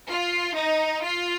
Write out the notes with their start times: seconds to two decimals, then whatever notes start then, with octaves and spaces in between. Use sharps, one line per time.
0.09 F4
0.56 D#4
1.03 F4